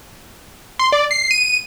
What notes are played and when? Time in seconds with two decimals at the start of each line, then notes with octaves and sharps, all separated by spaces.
0.79 C6
0.92 D5
1.11 C7
1.31 D#7